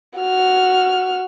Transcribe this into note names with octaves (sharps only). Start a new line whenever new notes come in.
F#4 F6